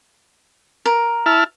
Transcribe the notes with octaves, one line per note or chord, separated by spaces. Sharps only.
A#4
E4 A5 F6